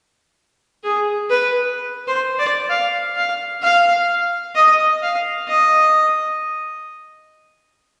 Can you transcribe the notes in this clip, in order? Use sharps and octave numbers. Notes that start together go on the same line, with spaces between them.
G#4
B4
C5
D5
F5
F5
F5
D#5
F5
D#5